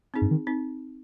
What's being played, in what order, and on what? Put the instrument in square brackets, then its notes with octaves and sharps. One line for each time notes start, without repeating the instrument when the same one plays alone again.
[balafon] C4 D#4 G#4
[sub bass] G2
D#3
[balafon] C4 D#4